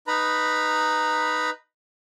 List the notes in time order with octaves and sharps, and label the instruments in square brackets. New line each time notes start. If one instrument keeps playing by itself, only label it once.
[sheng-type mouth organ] D#4 B4 A#5 B5